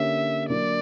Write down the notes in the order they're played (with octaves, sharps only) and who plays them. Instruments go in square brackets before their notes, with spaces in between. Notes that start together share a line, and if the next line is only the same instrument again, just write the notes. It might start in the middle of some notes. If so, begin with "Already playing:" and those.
Already playing: [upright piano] D3 A#3 C#4 G4 C#5 [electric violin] E5
[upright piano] D3 F#3 A#3 D4 [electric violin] D5